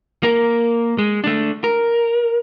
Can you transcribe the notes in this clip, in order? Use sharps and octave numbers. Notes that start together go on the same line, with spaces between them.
A#3 A#4
G#3
A3 D4
A#4